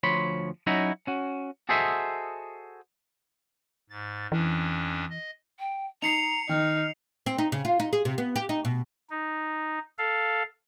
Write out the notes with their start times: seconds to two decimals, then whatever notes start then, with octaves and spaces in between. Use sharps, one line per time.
0.03 D2 F3 C#5 B5 C6
0.67 F#3 C#4 D#4 E4 F#4
1.07 C#4 F#4
1.69 F#4 G#4 A4 C5 D#5 E5
3.90 G#2 A6
4.32 F2 E3 C#4 D4
5.10 D#5
5.59 G5
6.02 D#4 A#5 C7 C#7 F7
6.49 D#3 D#4 F6
7.26 C4
7.38 D#4
7.52 C#3
7.65 F4
7.80 D#4
7.93 G#4
8.05 C3
8.18 B3
8.36 G4
8.49 D#4
8.65 B2
9.10 D#4
9.98 A4 F5